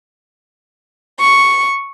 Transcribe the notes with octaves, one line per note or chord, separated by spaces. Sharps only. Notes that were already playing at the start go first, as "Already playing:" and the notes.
C#6